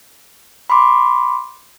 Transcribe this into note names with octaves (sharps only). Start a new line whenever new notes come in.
B5 C6 D6